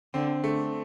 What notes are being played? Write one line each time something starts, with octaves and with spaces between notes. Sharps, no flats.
D3 C4
D3 A3